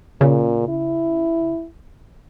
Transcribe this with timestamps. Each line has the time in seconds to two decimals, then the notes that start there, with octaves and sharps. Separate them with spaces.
0.21 A#2 C#3
0.68 E4